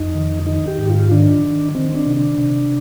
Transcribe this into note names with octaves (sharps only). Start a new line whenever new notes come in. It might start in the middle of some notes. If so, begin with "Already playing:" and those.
Already playing: F2 D#4
D#3
D#3 D#4
G4
G#2
F4
D#3 D4
D#3
D#3 C4
D4
C3
D4
C3